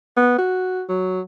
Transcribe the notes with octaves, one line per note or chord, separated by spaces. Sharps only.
B3
F#4
F#3